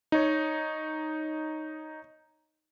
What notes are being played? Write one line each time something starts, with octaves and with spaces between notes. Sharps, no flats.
D#4 C#5